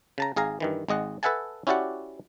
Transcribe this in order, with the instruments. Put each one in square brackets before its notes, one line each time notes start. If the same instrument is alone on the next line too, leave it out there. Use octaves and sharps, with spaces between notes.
[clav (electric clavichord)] C#3 A5 A#5
G#1 G#4 F5 A#5
G2 D#3 E3
G#1 G#3 D#5 F#5
A4 B4 E5 F#5 G#5 A5
C#4 E4 F#4 G4 D5 F#5